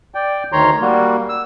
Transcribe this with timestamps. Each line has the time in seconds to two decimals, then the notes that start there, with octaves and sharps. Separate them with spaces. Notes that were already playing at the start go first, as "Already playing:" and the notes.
0.15 D5 G5
0.52 D2 D#3 C#5 A#5 C6
0.81 G3 A#3 F#4
1.29 E6